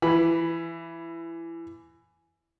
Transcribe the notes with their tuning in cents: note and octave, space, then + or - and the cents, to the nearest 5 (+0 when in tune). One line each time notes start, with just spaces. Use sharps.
E3 +20 B5 +0